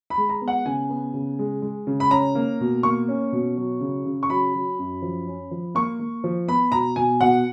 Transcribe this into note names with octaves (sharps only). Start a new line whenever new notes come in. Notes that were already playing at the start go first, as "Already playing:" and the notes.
B5
G#3
A#5
B3
F#5
C#3 G#5
B3
C#3
G#3
G#3
C#3
B5
C#4 A#5
A#3
B2
A#3 C#6
C#4
B2
F#3
C#3
C#3
C#6
F#3 B5
F#3
F#2
F3
C#4
F3
A#3 C#6
A#3
F3
B3 B5
B2 A#5
B2 G#5
B2 F#5